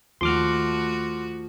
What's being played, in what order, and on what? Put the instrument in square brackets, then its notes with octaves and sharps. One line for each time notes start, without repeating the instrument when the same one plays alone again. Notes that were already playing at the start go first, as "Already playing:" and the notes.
[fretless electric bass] D#2 [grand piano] F3 [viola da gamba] A3 F#4 [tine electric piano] C6 D6 F6